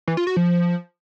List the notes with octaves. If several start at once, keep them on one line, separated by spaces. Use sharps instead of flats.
E3
F4
F#4
F3